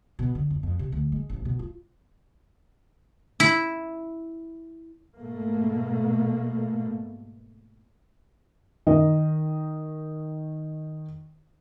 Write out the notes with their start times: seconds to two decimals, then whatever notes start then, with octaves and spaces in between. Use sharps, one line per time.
0.19 B2
0.35 D3
0.50 F2
0.63 F2
0.79 C3
0.92 D2
1.12 G#3
1.29 A1
1.45 B2
1.59 F4
3.40 E4
5.19 G#2 B2 A3 A#3
8.87 D#3 D#5